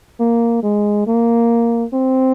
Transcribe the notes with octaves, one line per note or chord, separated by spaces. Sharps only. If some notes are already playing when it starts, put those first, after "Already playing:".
A#3
G#3
A#3
C4